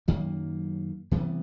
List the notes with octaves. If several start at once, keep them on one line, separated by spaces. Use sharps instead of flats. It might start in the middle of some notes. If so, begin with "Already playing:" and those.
F#2 D#3 F#3 A#3
C3 E3 G3 B3